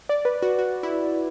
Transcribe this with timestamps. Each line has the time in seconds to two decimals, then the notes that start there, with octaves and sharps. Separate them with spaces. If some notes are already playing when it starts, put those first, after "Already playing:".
0.09 D5
0.25 B4
0.42 F#4
0.59 F#4
0.83 E4